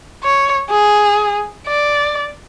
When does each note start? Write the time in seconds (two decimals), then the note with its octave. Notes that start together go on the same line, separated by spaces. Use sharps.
0.24 C#5
0.71 G#4
1.67 D5